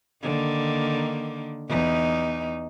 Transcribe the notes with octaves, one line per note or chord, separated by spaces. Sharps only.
D3 D#3 A#3
E2 D#4